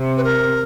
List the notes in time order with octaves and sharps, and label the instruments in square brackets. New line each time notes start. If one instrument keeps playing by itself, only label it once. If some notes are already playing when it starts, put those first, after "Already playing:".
Already playing: [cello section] C3
[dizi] B4
A#4